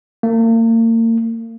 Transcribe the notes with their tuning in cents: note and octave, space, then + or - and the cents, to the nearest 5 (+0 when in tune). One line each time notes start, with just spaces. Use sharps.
A#3 -40